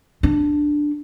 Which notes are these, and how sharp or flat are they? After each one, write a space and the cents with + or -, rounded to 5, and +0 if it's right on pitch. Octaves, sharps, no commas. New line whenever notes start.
D4 +5